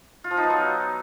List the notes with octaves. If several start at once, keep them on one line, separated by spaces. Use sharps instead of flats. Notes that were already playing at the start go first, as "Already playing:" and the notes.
F4
F3
D#4
B3
F#3